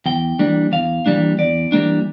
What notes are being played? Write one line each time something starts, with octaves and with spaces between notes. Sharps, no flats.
E2 G5
E3 G3 A#3 D4
E2 F5
E3 G3 A#3 D4
E2 D5
E3 G3 A#3 D4